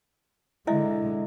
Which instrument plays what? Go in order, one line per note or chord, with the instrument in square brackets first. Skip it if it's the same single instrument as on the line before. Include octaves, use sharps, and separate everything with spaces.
[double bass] D3 G#3 [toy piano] E4 D#5 E5